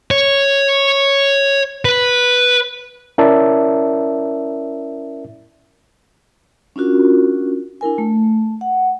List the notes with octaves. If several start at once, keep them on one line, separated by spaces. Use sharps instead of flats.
C#5
B4
C#4 E4 A#4 D5 E5 A5
C#4 D4 F4 F#4 A#4
D4 E4 A#4 G#5
A3
F#5